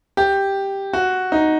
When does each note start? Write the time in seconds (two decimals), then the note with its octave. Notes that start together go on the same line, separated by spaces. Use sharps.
0.17 G4
0.93 F#4
1.32 D#4